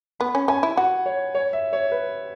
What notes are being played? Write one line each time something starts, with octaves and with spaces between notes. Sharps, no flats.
B3 B5
C#4
C#4 G#5
E4
F#4 F#5
C#5
C#5
E5
C#5
B4